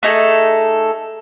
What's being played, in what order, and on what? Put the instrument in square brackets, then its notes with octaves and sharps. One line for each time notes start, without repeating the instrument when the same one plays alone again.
[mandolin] A3 D#4 G#4 A4